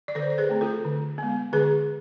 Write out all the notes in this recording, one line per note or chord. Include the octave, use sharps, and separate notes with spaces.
D5
D3 A4 C5
C5
G#4 B4
A3 C4
F4 A4
D3
G#3 B3
D3 G#4 B4